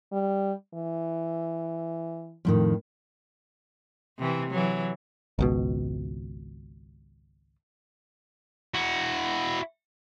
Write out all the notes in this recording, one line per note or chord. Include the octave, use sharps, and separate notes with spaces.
G3
E3
F2 A2 D#3
C3 E3
E3 F#3
G#1 C#2 B2
E4 F#4